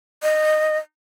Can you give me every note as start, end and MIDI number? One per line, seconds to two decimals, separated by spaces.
0.23 0.78 75